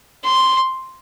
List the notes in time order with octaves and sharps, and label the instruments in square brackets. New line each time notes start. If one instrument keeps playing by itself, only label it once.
[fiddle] C6